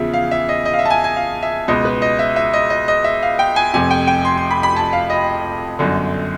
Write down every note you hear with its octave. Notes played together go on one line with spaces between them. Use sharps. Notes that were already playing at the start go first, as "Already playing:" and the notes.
Already playing: E2 C#3 F3 E5
F5
E5
D#5
D#5
F5
E5
A5
G#5
G#5
F5
E5
C#2 B2 D#5
B4
D#5
E5
E5
D#5
D#5
D#5
E5
F5
G5
G#5
F1 F2 C3 G#5
G5
G5
C6
C6
B5
B5
A5
F5
D#5
G1 F#2 D3